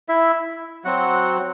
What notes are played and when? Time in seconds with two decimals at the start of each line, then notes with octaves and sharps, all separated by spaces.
0.09 E4 E5
0.85 F#3 C4 F#4 F#5